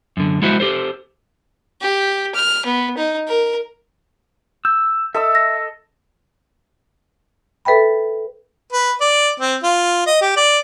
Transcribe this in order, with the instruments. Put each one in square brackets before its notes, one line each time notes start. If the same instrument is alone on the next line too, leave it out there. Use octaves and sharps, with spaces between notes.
[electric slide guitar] F#2 D3
G#3 E4 F#4 C5 E5
G4 A4 C5
[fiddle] G4
F6
B3
D#4
A#4
[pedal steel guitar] E6 [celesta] G6
[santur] A4 D#5 E6 [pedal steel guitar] E5
[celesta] A#6
[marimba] A4 B4 E5 G5 B5
[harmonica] B4
D5
C4
F4
D#5
G4
D5